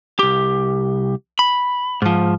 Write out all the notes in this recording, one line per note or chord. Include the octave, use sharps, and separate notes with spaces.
C2 G4
B5
G#2 F3